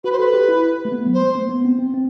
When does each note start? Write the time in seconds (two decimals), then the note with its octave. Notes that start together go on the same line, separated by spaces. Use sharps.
0.04 F#4 B4
0.12 C5
0.19 A4 B4
0.34 G4
0.49 E4
0.85 A3
0.92 B3
1.06 F#3
1.14 C5
1.21 A3
1.36 B3
1.50 B3
1.65 C4
1.79 C4
1.94 C4